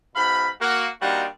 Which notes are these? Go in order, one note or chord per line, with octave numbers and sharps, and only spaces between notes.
G#2 B2 F5 B5
A#3 F#4
G3 A#3 D4 D#4 F4 F#4